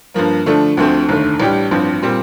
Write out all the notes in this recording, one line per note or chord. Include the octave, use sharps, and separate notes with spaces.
G2 F3 A#3
D3 F3 A3 D4 A4
D2 D3 F3 A3 C4
F1 D#2 D3 A3
A1 A2 G3 D4 G4
A1 G2 F3 C4
A#2 G3 C4